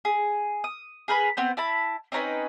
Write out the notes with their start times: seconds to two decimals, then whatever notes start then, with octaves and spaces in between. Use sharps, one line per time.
0.05 G#4
0.64 D#6
1.08 G#4 A#4 B4 B5
1.37 B3 C4 C5
1.57 E4 A5 B5
2.12 C4 C#4 D#4 B4